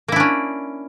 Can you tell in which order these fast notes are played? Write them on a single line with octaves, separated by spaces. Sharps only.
A#3 E4 D4 C#4